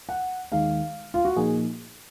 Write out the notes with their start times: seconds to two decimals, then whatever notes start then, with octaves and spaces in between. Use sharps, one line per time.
0.09 F#5
0.52 D#2 D#3 G#3 D#4 F5
1.14 F4
1.25 F#4
1.36 A#2 F3 A#3 D#4 G#4